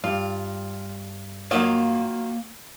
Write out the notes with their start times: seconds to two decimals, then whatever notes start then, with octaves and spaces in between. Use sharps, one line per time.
0.04 G2 F4
1.51 D#3 F#3 A#3 F4